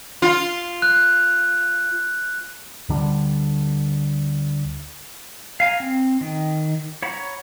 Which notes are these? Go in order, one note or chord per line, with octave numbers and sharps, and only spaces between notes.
F4
F#6
D2 D3 G3
F5 G#5 A#5
C4
D#3
C#5 F#5 A#5 B5